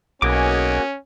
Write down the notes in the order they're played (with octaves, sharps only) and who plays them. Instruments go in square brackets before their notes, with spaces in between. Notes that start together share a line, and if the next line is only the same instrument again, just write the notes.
[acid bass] B1 [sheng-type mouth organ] A#3 F#4 G#4 [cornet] C#4 [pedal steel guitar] D#5 G#5 D6